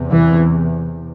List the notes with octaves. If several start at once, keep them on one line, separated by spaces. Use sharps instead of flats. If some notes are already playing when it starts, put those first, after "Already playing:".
Already playing: E2 C3
E3